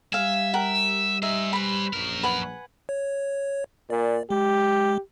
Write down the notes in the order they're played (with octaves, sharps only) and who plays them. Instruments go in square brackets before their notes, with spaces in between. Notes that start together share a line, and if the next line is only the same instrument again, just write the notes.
[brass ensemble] G3 [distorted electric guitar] E5 [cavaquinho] F5 G#5
[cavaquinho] A#4 F#5 G5
[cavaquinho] D#4 E5 [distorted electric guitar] C5 G#5
[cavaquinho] B4 B5
[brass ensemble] A#1 [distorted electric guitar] F#2 A#4
[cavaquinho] B4 F#5 G#5
[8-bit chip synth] C#5
[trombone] A#2 [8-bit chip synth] D5
[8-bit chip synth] G#3 [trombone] G4